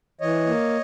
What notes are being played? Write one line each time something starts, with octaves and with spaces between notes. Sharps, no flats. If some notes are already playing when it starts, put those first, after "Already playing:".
E3 C#5 D#5
A#3